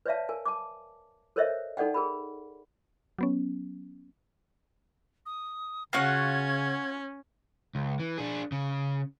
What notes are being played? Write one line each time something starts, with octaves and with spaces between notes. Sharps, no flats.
B4 C#5 D5 E5 F5 A5
A#4 G#5
A5 D6
A4 A#4 C5 C#5 D#5 E5
D#4 A4 D5 F#5 G5
G#4 A#4 B5
F#3 B3 C#4
D#6
C#3 C#4 F4 F#4 F#5 G#6
C#2
E3
D4 G#4
C#3